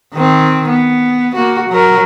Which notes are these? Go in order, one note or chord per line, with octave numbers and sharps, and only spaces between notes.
D#3 C4
B3
A#3 F#4
F#3 A#4